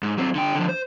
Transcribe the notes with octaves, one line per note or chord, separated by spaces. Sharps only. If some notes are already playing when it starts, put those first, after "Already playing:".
G#2
F#3 C4
D3 G5
D3 F3
C5